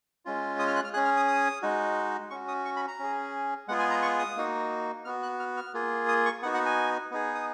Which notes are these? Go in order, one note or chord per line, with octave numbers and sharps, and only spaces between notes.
G#3 C#4 F4
D#6
F6
F#6
F6
C#4 G#4 F#6
F6
D#6
D#6
G#3 D#4 F#4
C#4 F#4 C#6
D#6
C#6
B5
A#5
C#4 G#4
G#3 B3 F4 G#4 F#5
G#5
A#5
C#6
D#6
A#3 D#4 F#4
B3 F#4 F6
F#6
F6
F6
A#3 F4 G#4
D#6
C#6
B3 D#4 F#4 F#5
F#5
G#5
B3 D#4 G#4
D#6